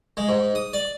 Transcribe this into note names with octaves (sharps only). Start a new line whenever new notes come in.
G#3
G#2
D#6
D5